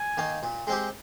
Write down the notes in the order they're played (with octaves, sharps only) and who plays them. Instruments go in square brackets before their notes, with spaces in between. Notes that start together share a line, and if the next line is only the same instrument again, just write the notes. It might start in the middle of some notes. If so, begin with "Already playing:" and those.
Already playing: [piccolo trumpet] G#5
[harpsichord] D#3 A#3
A#2
G#3 C4 G4